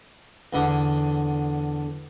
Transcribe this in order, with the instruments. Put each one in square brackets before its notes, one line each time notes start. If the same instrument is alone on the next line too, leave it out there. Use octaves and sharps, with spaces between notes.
[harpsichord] E2 D3